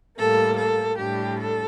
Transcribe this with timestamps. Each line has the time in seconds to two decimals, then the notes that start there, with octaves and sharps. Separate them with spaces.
0.17 A2 G3 A#3 A4
0.56 A4
0.97 A2 G3 D4 G4
1.38 A4